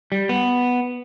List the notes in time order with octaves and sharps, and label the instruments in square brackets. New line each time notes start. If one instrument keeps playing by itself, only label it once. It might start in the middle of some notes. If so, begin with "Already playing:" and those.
[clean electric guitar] G3
B3